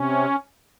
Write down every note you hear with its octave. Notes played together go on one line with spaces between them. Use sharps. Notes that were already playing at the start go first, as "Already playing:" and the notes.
Already playing: C3 C#4